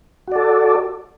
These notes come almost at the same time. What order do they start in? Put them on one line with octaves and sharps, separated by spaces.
F#4 D5 A4